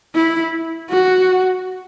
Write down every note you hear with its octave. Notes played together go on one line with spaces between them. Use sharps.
E4
F#4